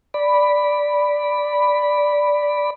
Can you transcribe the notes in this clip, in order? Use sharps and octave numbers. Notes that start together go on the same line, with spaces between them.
D5 B5